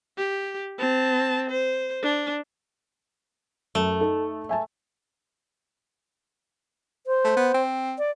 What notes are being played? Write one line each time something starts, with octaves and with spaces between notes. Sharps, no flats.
G4
C4 A5
C5
D4
F#2 A3
D#4 A4
E5 G#5 A5
C5
A3
B3
C4
D5